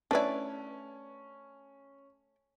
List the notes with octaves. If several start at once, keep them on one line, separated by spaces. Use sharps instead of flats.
A3 C#4 D4 E4 B4 D5